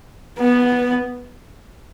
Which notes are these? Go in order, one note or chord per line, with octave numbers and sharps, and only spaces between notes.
B3